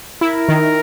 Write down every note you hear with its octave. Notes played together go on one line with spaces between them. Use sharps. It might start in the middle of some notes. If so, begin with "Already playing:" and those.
E4 A#4
D#3